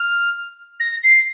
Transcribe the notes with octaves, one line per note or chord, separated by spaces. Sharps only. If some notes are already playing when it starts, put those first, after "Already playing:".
Already playing: F6
A#6
C7